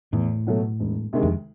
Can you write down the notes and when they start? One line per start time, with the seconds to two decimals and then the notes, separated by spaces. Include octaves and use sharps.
0.13 E2 A2
0.47 B2 F#3 A3
0.80 E1
1.13 D2 C3 D#3 G#3
1.23 F2